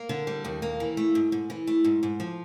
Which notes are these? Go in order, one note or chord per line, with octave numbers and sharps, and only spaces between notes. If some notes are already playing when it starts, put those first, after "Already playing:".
Already playing: A#3
D3
G3
D#2
A#3
E3
A3
G#2
G#2
E3
A3
G#2
G#2
F3